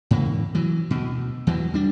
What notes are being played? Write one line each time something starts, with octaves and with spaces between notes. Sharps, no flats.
G#2 C#3 E3 A#3
E3 F#3
D2 B2
E2 E3 F#3
G3 D4